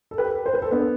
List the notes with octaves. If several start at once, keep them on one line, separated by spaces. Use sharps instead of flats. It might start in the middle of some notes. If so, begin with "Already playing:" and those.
A4
G4 B4
C5
B4
A4 C5
B3 D4